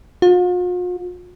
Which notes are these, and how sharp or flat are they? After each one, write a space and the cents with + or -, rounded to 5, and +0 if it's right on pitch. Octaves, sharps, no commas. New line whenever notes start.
F4 +45